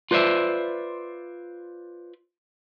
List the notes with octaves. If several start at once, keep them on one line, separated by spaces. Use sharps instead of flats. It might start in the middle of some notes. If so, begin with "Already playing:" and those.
F4 B4 C5 D5 E5